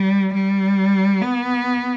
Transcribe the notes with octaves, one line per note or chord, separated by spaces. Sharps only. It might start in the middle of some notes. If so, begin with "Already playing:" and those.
Already playing: G3
G3
B3